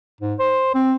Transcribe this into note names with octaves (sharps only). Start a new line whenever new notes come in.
G#2
C5
C4